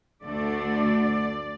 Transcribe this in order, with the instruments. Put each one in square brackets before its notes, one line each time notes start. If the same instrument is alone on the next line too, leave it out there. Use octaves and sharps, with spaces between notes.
[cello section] D2 D3 A3 D4 D5